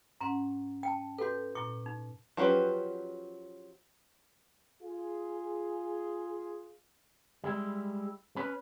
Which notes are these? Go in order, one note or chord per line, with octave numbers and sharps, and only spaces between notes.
G#2 C#4 F#5 A#5
G5 A5
F#4 A4 B4 G6
A#2 E4 C#6
D#4
F3 F#3 C#4 G4 B4
F4 G#4
G3 G#3 E4
C#4 B4